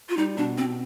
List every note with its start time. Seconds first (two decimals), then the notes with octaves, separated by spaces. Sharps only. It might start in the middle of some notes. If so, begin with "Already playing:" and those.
0.09 F4
0.17 G3 D#4
0.37 B2 D4
0.58 B2 C4